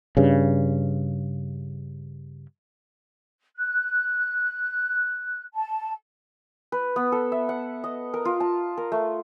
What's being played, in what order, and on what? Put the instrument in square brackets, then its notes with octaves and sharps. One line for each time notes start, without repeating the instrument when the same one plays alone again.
[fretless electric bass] G2 C#3
[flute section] F#6
A5
[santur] B4
B3
A4
E5
F#5
D#5
A#4
F4
A5
A#4
A3